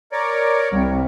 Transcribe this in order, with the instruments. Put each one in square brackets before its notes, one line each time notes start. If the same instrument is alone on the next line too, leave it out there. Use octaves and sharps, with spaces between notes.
[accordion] A#4 C#5 D5
[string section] C2